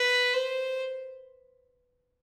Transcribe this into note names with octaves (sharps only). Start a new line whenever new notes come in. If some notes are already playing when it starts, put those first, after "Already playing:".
Already playing: B4
C5